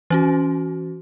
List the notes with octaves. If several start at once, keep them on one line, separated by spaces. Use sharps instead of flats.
E3 C#4 F#4